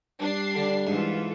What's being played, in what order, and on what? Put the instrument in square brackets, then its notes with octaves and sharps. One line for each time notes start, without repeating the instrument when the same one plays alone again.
[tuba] G3 [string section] D4 C7
[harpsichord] D3
[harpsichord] G#2 [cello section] E3 F4 A4